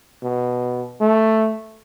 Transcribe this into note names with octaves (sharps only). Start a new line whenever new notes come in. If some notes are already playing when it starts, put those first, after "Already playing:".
B2
A3